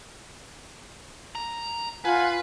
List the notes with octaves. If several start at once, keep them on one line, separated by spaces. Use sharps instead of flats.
A#5
F4 B4 F5 F#5 G#5